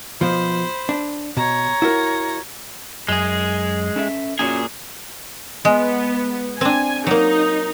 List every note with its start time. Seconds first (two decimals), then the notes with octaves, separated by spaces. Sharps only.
0.21 B2 F3 C5 B5
0.89 D4
1.37 B2 C#5 A#5
1.82 E4 F#4 A#4
3.08 F#2 G#3 G#4
3.96 C#4 A4 E5
4.39 A#2 C#4 F#4 G#4 C#5
5.65 G#3 B3
6.61 C4 D4 G#5
7.07 F#3 A#3 D#4